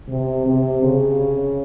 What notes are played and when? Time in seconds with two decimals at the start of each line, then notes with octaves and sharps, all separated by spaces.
0.09 C3
0.46 C3
0.83 C#3